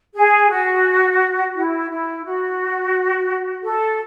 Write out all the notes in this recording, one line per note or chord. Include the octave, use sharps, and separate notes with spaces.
G#4
F#4
E4
E4
F#4
A4